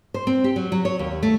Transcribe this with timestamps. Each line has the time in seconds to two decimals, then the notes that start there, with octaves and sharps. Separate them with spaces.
0.14 C5
0.27 C4
0.44 G4
0.56 F#3
0.72 F#3
0.85 C#5
0.99 D#2
1.23 A3